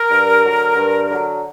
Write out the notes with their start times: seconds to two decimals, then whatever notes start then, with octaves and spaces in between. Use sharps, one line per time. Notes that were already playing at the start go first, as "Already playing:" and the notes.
Already playing: A#4
0.10 G2
0.43 D3 F#3
0.76 G2
1.10 D3 F#3